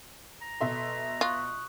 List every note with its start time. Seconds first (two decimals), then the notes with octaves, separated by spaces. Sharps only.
0.41 A#5
0.61 B2 A4 E5 C6
1.21 F4 C#6 D#6 F#6